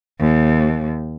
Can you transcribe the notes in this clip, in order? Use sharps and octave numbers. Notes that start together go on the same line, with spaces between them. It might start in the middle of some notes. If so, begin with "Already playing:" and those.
D#2